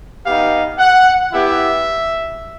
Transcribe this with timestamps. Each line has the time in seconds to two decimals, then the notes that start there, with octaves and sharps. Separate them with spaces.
0.24 B3 D#4 G4 F5
0.78 F#5
1.33 B3 E4 G4 E5